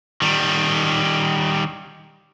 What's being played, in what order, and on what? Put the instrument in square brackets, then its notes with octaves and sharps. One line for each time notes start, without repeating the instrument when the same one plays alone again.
[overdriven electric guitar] D#3 G3